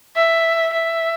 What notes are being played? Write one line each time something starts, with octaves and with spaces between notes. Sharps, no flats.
E5
E5